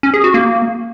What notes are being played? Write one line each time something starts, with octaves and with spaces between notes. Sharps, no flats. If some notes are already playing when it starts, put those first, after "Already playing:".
C#4
G#4
F#4
A#3